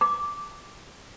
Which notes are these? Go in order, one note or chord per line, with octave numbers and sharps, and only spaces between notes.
D6